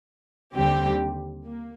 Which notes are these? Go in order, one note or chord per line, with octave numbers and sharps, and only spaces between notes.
D#2 D3 G3 C4 G4
A#3